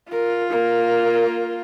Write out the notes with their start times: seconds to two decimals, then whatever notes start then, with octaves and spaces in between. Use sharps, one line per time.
0.11 F4 A#4
0.50 A#3 A#4